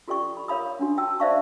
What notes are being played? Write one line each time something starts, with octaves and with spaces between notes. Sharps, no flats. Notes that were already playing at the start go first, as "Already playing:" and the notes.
F4 G4 A4 D5 G5 C#6
B5
A#4 C#5 F5 B5 D#6
C#4 D4 F#4
F#4 G5 A5 E6
C5 D5 E5 F5 A5 C#6